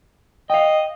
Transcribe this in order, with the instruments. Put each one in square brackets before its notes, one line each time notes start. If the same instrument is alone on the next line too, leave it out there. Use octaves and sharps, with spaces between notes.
[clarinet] D#5 [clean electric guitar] F5 G5